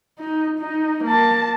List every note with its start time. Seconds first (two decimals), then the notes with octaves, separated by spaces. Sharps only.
0.19 D#4
0.59 D#4
1.04 A#3 A5